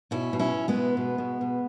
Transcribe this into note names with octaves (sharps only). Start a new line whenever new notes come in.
B2 C#4 E4
B2
C#4 E4
B2
G#3 B3
B2
B2
B2
B2